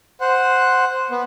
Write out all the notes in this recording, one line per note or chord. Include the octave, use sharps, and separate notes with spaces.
C5 F#5
B3